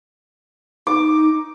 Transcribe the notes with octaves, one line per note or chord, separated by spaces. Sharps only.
D#4 D6